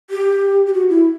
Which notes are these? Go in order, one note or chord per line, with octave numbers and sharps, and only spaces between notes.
G4
G4
F#4
E4